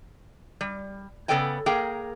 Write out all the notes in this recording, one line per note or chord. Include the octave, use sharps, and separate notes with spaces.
G3
C#3 B3 A4 D5 G5 G#5
A#3 G#4 A#4 G5